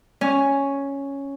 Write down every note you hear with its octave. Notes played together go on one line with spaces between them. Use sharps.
C#4